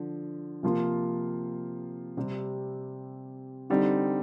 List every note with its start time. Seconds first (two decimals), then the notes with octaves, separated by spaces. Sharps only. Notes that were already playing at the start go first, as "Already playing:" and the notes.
Already playing: D3 F3
0.63 C3 F3 A#3 F4
2.17 C3 G3 C4
3.70 D3 G3 C4 D#4